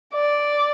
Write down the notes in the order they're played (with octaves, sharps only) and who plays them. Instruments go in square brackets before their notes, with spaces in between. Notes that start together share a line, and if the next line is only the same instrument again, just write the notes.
[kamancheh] D5